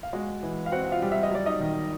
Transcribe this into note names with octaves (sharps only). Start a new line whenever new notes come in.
F5
G#3 F#4 F#5
E3
F5
C4 F#4 F#5
F#5
F4 F5
G3
E5
D#5
F#3 D5
D#4 D#5
D#3